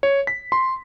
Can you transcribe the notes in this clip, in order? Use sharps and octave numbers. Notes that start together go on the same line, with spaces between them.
C#5
B6
C6